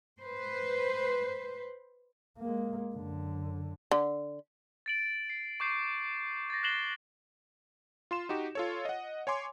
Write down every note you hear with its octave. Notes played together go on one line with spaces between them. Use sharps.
B4 C5
G#3 A#3
F#2 D3
D3
A6 D7 F#7
C7
C#6 D6 G6 C7
A6 A#6
F#6 A#6 C7 E7 F#7 G7
F4 C6 E7
D#4 F#4 G4
F4 A4 C#5
D#5 F#5
C#5 G#5 C6 D6